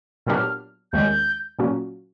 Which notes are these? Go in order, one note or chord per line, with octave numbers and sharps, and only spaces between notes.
A#2 F#3 B3 D4 G4 F6
D#2 D#3 G#3 C#4 G6
A#2 F#3 A#3 C#4 F#4